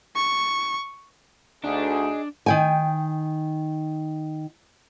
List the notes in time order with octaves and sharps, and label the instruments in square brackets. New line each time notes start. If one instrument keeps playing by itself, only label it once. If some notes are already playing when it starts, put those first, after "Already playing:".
[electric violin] C#6
[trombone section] D2 [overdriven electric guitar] D4 [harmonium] D#4 G#4
[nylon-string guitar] D#3 G5 G#5